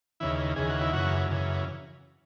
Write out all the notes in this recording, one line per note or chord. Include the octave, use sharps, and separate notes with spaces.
D#2 C#3 E3 E4
D#2 C#3 E3 G#4
F#4
E4
F#2 C#3 E3 F#4
F#2 C#3 E3